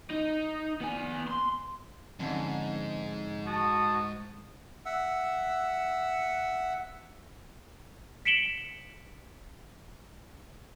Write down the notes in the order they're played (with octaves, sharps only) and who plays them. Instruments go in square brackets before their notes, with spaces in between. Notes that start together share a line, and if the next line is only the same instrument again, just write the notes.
[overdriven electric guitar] D#4
B3 G#5
C6
[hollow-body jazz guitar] F2 D3 C#4 [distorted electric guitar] G#2
[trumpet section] F#4 A5 D#6
[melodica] E5 F#5 E6
[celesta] B6 C#7 D7 E7 F#7 G7